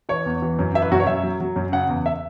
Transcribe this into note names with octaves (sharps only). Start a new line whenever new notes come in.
E3 C#5
E2
E3
F#2
E3 E5
B4
F#2 F#4
C#5
F#2 E5
F#3
F#3
F#2
C#3 F#5
E2
E5